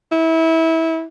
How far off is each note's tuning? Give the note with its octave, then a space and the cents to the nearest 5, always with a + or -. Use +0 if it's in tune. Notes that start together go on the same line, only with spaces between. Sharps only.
E4 -25